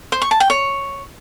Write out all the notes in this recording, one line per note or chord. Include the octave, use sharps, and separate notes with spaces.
C5
C#6
A5
G5
C#5